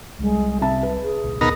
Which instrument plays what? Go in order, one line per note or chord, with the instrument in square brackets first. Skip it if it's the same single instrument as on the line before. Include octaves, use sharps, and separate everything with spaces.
[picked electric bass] C2 G3 [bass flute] G#3
[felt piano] C3 A5 [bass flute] E5
[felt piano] B4
[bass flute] G#4
[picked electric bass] D1 B1
[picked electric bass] F1 D#2 B2 [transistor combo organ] B3 D#4 A#4